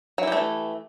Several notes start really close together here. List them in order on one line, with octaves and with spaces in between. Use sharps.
F#3 E4 G4 A3 E3